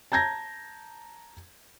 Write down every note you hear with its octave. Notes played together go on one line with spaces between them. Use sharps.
A5 A#5 G6 G#6 A#6